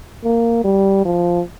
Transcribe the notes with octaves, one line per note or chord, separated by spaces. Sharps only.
A#3
G3
F3